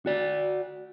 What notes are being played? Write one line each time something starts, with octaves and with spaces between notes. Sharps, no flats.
F#4 D5